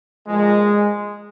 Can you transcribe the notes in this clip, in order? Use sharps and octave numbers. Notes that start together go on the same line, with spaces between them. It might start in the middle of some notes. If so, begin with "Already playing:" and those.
A#2 F3 G#3